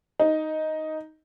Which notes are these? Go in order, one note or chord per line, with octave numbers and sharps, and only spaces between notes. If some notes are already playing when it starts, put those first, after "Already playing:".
D#4